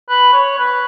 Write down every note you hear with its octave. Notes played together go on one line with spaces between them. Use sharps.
B4
C#5
B4